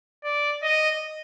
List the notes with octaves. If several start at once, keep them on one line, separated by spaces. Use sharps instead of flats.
D5
D#5